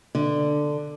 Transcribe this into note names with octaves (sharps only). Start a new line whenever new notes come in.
D3